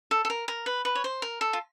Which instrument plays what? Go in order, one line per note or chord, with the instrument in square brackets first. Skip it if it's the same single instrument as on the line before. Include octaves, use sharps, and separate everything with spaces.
[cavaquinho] A4
A4
A#4
A#4
B4
B4
C#5
C5
A#4
A4
F4